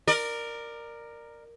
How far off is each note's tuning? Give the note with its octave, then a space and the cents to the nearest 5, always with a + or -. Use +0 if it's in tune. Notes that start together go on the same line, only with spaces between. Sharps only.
A#4 +0 D5 +25